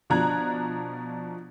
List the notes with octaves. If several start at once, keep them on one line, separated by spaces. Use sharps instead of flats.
B2 F3 D4 A#5 F#6 G#6